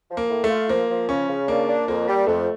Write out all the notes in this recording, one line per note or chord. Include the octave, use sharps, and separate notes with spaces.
F3
A#3
A2
A3
F4
F3 A#3
F3
C#3 C#4
C#3
A#3 D4
D4
F2 A#3
G3
F2 A3